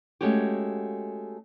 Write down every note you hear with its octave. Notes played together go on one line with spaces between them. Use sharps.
G#3 A3 C#4 F#4 G4